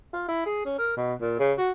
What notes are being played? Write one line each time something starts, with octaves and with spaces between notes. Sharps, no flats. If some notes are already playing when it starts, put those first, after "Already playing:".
F4
E4
G#4
C#4
A#4
B2
A#2
C#3
F#4